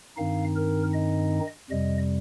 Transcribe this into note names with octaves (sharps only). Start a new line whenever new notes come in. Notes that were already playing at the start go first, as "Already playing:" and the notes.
G2 D#3 C4 D#4 F5
A#4
D#5
F2 C3 G3 D#5